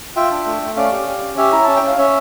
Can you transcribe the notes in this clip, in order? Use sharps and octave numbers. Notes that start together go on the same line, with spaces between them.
F4 E5 G5
D4
A3
A3
C#4 D5 F5
G4
G4
C#4
G4 C#5 E5
E4 A#5
C#4 A5
G5
C#4 F5
C#4 C#5 E5